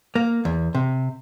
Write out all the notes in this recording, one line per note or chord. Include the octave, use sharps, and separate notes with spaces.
A#3
E2
C3